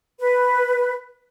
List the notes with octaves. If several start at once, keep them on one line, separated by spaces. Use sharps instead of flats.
B4